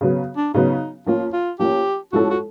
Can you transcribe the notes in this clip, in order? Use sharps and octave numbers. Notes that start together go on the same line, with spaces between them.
C#3 F#3 B3
D4
C#3 F#3 B3 D#4
F3 A#3 C#4 F4
F4
F3 A#3 C#4 G4
F3 G#3 C#4 E4 F#4 A4
F#4